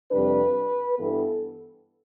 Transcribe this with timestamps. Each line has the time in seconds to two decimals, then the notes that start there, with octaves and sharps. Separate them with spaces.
0.11 F2 C3 G3 D4 B4
0.96 G2 E3 B3 A4